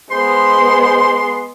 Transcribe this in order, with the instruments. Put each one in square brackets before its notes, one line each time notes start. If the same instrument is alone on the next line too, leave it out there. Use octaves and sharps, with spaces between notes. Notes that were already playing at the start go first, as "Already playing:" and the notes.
[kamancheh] G#3 B3 [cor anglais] C5 [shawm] C6